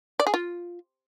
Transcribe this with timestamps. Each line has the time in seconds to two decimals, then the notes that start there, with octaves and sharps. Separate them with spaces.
0.20 D5
0.27 G#4
0.34 F4